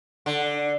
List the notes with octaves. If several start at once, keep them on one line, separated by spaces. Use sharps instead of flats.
D3